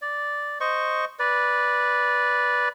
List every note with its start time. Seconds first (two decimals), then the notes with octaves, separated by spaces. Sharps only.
0.02 D5
0.60 C5 D#5 C#6
1.19 B4 D5